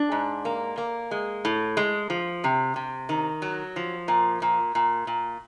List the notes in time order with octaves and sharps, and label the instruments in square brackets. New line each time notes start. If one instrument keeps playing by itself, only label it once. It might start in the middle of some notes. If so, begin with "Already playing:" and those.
Already playing: [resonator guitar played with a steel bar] D4
G#2
A#3
A#3
G#3
A2
G#3
F3
C3
C3
D#3
F#3
F3
A#2
A#2
A#2
A#2